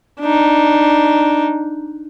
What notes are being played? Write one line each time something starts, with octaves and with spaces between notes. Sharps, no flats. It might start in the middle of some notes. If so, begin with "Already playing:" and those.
D4 D#4